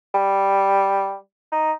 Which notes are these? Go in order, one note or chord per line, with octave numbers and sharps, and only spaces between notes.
G3
D#4